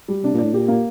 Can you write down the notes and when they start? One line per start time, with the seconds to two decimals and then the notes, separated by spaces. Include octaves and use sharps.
0.08 G3
0.23 C3 D4
0.34 A#2 D5
0.44 A2
0.54 A#2 G4
0.68 A#3